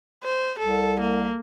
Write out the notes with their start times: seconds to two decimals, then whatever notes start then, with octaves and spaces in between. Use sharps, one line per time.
0.24 C5
0.59 C2 A4
1.00 A#3